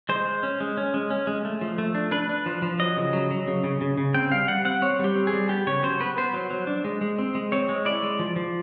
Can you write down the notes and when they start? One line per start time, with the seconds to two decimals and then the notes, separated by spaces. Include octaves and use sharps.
0.09 G#3 C5
0.26 G#3
0.43 C#4
0.60 G#3
0.77 C#4
0.94 G#3
1.10 C#4
1.27 G#3
1.45 A3
1.61 F3
1.78 A3
1.95 D4
2.11 D4 B4
2.29 D4
2.46 F3
2.62 F3
2.79 F#3 D#5
2.97 C#3
3.13 F#3
3.31 F#3
3.48 C#3
3.64 C#3
3.81 C#3
3.98 C#3
4.14 C4 G5
4.31 G3 F5
4.48 G3 F#5
4.65 C4 F#5
4.82 C4 C#5
4.99 G3 G4
5.16 C4
5.27 G#4
5.33 G3
5.49 B3 G4
5.67 C#3 C#5
5.83 F#3 C5
6.00 B3 B4
6.17 B3 C5
6.34 F#3
6.50 F#3
6.67 D4
6.84 G#3
7.01 G#3
7.18 C4
7.35 G#3
7.52 C4 C#5
7.69 G#3
7.85 E4 D5
8.03 G#3
8.19 F3
8.36 F3